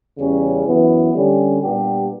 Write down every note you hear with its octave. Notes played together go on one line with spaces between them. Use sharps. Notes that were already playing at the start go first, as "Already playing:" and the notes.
E2 C#3 G3 C#4
F#2 E3 B3
D3 G3 C#4 G4
A#2 G3 B3 D4 G4